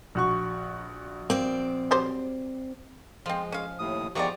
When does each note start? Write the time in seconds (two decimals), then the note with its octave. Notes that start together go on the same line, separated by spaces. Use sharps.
0.15 A#1 F#4 C#6
1.30 A#3 C4 D5
1.91 F#3 G3 C5
3.26 F3 G#3 C4 F4
3.52 C#4 F5
3.79 D#2 A2 D#6
4.15 E2 D#3 F3 G#3 G4 D5 A#5 C#6